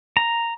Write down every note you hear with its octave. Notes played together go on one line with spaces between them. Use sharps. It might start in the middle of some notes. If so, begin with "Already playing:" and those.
A#5